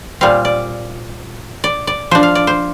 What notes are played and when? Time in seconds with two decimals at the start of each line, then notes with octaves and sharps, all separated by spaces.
0.21 A#2 G3 C4 F5
0.45 D5
1.64 D5
1.87 D5
2.11 F3 D4 C5
2.23 F5
2.35 D5
2.47 C5